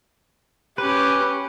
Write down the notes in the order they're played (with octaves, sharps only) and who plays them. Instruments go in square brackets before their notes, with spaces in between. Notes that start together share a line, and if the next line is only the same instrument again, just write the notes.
[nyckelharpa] C#4 G4 [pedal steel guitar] B4